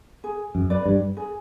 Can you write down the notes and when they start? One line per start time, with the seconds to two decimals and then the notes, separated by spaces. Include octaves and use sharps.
0.24 G#4
0.55 F#2
0.70 B4 D5
0.85 G2
1.17 G#4